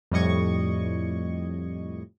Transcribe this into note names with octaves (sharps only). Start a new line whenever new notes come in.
F2 A2 G3 D#5 C#6 G#6